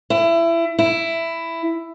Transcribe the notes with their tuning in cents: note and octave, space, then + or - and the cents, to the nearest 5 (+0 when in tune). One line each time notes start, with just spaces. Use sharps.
E4 +25
E4 +10